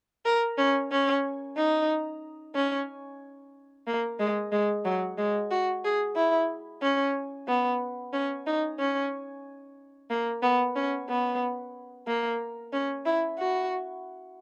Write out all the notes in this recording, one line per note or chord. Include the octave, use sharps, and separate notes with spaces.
A#4
C#4
C#4
D#4
C#4
A#3
G#3
G#3
F#3
G#3
F#4
G#4
E4
C#4
B3
C#4
D#4
C#4
A#3
B3
C#4
B3
A#3
C#4
E4
F#4